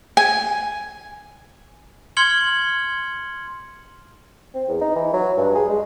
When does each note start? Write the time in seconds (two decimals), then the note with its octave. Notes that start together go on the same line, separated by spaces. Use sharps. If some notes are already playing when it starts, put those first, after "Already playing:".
0.17 G#5
2.17 C6 F6 G#6 C#7 F#7 G7
4.55 C4
4.68 E2
4.81 D#4
4.96 E3
5.14 F#3
5.38 G2
5.55 G#4
5.69 G#3